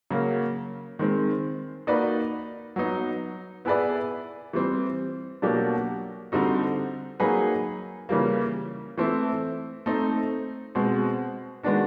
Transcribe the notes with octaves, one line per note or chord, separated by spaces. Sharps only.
C#3 F#3 A#3
D#3 G#3 C4
A#3 D#4 F#4 B4 D5
F#3 B3 D#4
B3 E4 G#4 B4 D5
E3 G3 C4
B2 F#3 A#3 D4 G4
D3 G3 C4 D#4 F#4
F#3 A#3 D#4 G#4 B4
C#3 E3 G3 A#3
E3 A3 C4 E4
A3 C4 D#4
B2 G#3 C4
D#3 G#3 B3 D4 F#4